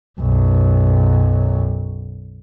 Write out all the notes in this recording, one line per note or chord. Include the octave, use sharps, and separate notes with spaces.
B1 F#2